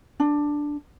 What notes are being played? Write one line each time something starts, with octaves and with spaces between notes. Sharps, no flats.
D4